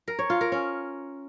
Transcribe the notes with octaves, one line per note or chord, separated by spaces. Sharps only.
A#4
C#5
F4
A#4
C#4